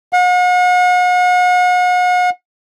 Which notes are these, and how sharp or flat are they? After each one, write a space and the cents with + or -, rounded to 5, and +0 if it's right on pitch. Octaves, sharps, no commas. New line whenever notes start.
F#5 -40